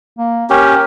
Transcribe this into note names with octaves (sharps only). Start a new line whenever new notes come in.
A#3
C#4 G4 A#4